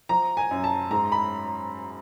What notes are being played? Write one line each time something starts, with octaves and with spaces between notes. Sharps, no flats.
F3 A#5
G#5
F#2
A5
G#2 A#5
B5